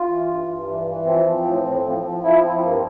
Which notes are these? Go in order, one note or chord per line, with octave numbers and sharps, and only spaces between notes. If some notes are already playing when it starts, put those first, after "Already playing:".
Already playing: F4
E3
G2
G2
E3
E3
F3 C4
F3
A2
A2
F3
F3
F3 E4
F3 C4
G2 A#3